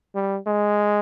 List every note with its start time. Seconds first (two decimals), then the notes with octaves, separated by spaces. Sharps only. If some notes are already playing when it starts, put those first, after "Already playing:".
0.15 G3
0.47 G#3